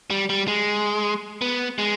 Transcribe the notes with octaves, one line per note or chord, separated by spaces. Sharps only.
G3
G3
G#3
B3
G#3